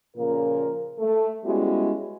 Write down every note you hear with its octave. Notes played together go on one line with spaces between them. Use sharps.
A#2 C#3 F3 A#3 A#4
A3
G3 G#3 B3 C#4 E4 F#4